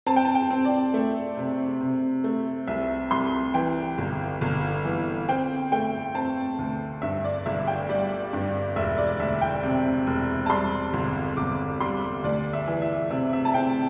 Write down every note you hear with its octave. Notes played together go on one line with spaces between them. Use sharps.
C4 A5
G5
A5
G5
C4
D5
A3
C3
C3
A3
C2 E5
C2 C6
E3 G5
G1
G1
E3
C4 G5
A3 G5
C4 A5
D2
G2 E5
D5
G1 E5
G5
G3 D5
G2
E1 E5
D5
D2 E5
G5
C3
E1
A5
G3 C6
G1
G1 D6
G3 C6
D2 D5
E5
E3
E5
C3 E5
E5
A5
C4 G5